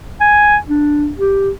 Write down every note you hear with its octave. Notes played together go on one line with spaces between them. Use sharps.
G#5
D4
G4